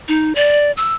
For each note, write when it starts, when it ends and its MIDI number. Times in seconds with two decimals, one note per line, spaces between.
0.08 0.33 63
0.35 0.72 74
0.77 0.95 88